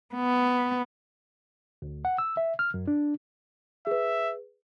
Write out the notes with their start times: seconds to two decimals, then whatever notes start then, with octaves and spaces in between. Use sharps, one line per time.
0.15 B3
1.82 D2
2.05 F#5
2.18 E6
2.37 E5
2.59 F6
2.74 F#2
2.88 D4
3.87 G#4 B4 E5